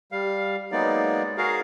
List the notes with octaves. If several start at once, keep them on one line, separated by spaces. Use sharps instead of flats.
G3 F5
F#3 G#3 A#3 B3 D#4 D5
F#4 G#4 A#4 F5